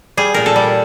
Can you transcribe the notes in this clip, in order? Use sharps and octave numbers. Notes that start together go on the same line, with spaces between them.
G3 G#4
A#2 A#4
A4
G3